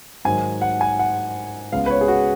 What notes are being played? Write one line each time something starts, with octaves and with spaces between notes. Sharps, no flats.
G#2 D#3 F#3 G#5
F#5
G#5
F#5
C#2 C#3 G#3 B3 F5
B4
C#5
G#4
F#4